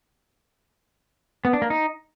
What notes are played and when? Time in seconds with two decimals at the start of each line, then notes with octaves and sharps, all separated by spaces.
1.45 B3
1.53 D4
1.62 A#3
1.70 D#4